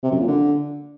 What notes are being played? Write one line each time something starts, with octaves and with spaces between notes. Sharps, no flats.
C3
F#2
A#2
D3